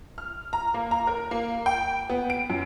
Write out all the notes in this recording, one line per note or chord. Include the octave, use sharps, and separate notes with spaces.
F6
A#5
A#3
A#5
A#4
A#3
G5
B3
D7
F#2